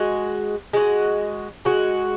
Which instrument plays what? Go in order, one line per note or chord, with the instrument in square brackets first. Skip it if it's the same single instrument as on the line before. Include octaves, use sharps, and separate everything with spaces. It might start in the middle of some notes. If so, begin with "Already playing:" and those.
Already playing: [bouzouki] G#3 F#4
G#3 F#4
G#3 F#4